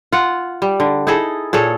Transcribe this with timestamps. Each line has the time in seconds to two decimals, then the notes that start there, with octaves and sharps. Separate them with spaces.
0.12 F4 F#5
0.62 G3
0.80 D3
1.07 D#4 E4 G#4 A4
1.53 A#2 G#4 A4 C#5